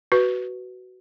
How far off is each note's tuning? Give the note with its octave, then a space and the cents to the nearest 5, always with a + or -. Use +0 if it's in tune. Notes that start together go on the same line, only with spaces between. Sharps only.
F#4 +15 B4 +0